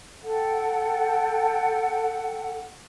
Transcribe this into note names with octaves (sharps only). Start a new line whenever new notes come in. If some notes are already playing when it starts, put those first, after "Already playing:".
A4 F#5 G5